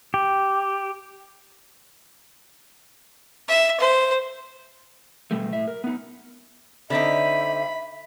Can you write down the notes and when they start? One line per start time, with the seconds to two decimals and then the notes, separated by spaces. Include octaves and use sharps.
0.14 G4
3.48 E5
3.80 C5
5.31 B2 G3 A3
5.52 A2 E5
5.68 A#4
5.84 B3 D#4
6.90 D3 C4 D#4 E5 B5